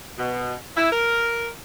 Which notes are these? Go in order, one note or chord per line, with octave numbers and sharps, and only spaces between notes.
B2
E4
A#4